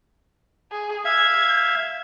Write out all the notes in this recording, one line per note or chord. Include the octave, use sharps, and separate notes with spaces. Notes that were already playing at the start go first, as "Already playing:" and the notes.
G#4
E5 F5 G#6